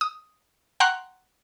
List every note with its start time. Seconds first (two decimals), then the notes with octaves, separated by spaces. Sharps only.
0.01 D#6
0.80 F#5 G5 A#5 C6 C#6 F#6